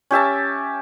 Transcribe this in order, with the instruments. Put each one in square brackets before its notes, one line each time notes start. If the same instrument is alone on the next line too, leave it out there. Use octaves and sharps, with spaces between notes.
[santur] C#4 G4 E5 A5